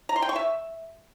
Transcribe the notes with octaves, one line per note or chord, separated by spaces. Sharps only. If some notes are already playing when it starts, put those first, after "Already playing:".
A#5
C6
G5
C#6
E5